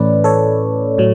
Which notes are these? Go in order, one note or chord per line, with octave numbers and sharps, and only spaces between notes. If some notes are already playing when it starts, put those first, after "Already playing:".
Already playing: A2 E3 A3 C#4 B4 D5
A4 C#5
A2 F#3